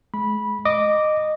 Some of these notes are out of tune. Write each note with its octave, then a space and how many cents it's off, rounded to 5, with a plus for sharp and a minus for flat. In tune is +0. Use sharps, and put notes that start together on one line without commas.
G#3 +35 B5 -15
D#5 -15 D6 -5